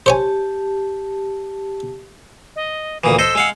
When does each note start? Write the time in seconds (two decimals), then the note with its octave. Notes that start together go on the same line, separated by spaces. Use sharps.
0.06 G4 C5 C#5 G#5 A5
2.56 D#5
3.04 D2 A#2 E3 D#6
3.19 A4 C5 D#5 E6
3.35 G#3 F5 F#5